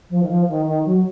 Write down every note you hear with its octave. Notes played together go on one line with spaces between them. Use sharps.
F3
D#3
F3
D#3
D#3
F#3